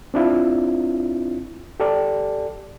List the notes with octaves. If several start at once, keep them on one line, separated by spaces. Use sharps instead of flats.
C4 D4 E4 F4
G4 A4 D5